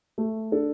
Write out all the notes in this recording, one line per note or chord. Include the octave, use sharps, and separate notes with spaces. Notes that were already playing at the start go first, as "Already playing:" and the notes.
A3
D4 A4